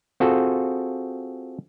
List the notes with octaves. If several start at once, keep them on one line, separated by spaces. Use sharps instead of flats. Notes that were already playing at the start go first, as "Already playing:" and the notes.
C4 F4 F#4 G#4 A4